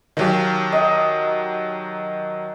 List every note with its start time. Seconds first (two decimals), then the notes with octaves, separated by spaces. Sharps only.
0.17 D#3 F#3 G4 F5 A5 A#5
0.73 D#5 F#5